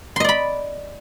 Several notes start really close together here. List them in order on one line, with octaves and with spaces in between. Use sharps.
C6 D#5 D5 B5